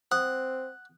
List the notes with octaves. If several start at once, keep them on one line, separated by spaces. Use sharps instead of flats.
C4 F#5 D#6